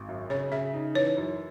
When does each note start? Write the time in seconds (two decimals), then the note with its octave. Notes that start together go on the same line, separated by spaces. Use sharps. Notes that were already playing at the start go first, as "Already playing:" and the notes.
Already playing: G#1
0.09 F#2
0.30 C#3 C#5
0.52 C#3 E5
0.73 D#4
0.94 E3 C#5
1.17 F#2